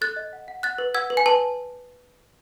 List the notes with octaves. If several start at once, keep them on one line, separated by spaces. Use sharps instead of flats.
A4 F#6 A6
D#5
F#5
F#5
F#5 F#6 A6
B4
F#5 E6 G#6
B4
G#5
B4 A5